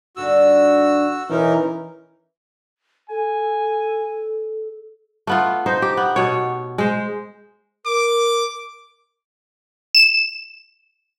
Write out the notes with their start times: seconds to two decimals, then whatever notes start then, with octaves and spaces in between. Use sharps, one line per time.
0.17 G2 D3 D#4 F#4 E6
1.30 E2 B2 E3 C#4 D#4 A#4
3.10 A4 G#5
5.27 A3 B3 F4
5.66 D#4 C5
5.82 G4
5.97 B3
6.16 B2 C#5
6.78 G#3 C5
7.86 A#4 D6
9.95 E7